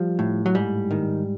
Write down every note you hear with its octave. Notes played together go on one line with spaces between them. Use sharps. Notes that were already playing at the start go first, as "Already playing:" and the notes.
Already playing: F3 G3
A2
F#3
G#2 G3
D#3